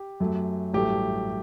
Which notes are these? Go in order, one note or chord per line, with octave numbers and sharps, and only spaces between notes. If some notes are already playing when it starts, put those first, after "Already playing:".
Already playing: G4
F#2 F#3 A3
A1 G2 F#3 A3 G4